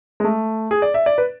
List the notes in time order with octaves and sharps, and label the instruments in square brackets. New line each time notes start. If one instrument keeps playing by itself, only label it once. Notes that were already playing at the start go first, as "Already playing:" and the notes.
[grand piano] G#3
A3
G#4
D5
E5
D5
B4